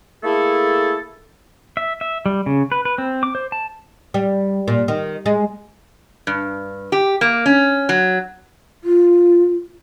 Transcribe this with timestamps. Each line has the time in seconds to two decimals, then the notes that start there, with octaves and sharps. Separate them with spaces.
0.23 A3 A#3 E4 G#4 A4
1.77 E5
2.01 E5
2.26 G3
2.46 C#3
2.72 B4
2.85 B4
2.98 C4
3.23 D6
3.35 C5
3.52 A5
4.14 G3
4.68 A#2
4.88 D#3
5.26 G#3
6.27 G2
6.92 G4
7.21 A#3
7.46 C#4
7.89 F#3
8.84 F4